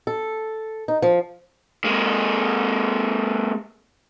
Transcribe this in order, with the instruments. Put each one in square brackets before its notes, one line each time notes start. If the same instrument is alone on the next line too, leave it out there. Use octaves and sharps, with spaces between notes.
[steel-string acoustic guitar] A4
D#4
F3
[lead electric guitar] G#3 A#3